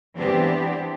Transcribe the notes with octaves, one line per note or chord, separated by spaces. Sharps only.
E3 B3 C4 D4 G4